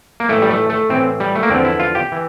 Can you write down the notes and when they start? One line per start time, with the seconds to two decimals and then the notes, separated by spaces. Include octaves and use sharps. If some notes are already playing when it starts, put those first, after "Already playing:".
0.20 A#3
0.29 A2 E3 A3
0.42 G3
0.50 A3
0.70 A3
0.90 A2 E3 C4
1.20 G3
1.35 A3
1.43 A#3
1.50 E2 D3 F3 C4
1.65 E4
1.80 F4
1.95 G4
2.12 E3